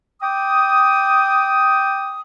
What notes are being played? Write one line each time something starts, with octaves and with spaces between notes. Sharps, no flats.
G5 D6 D#6